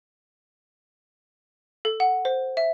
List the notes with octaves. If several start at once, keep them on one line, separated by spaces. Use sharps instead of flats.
A4
F#5
C5
E5